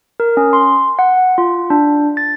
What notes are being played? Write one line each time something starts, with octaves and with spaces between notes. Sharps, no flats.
A#4
C#4
C6
F#5
F4
D4
A6